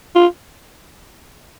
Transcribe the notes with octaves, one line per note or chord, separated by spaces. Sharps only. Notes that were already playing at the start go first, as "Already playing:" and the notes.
F4